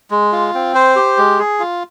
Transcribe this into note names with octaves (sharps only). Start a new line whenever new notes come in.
G#3
F4
C4
C5
G4
G#3
G#4
F4